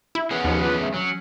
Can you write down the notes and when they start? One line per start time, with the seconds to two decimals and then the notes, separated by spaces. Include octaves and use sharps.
0.15 E4
0.31 B3 C#4 G#4 B4 F#5
0.44 D#2 F3
0.61 D4 F4 B4
0.80 C#3 F#3 A3
0.94 F#3 C#4